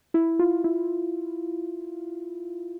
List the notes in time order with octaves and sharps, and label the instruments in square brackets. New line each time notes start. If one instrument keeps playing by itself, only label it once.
[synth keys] E4
F4
E4